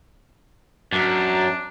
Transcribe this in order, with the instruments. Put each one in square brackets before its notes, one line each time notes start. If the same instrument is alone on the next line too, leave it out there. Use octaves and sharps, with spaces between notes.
[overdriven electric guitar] F#2 [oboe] D4